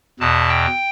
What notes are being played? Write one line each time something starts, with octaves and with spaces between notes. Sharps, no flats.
E2 B2 A5
G5